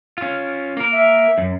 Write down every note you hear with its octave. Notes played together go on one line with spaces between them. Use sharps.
C#4 F4
A#3 A#4
E5
F#2